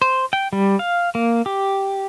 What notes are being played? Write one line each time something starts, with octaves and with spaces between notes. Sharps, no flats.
C5
G5
G3
F5
A#3
G4